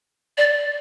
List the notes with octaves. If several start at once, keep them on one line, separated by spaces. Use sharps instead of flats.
D5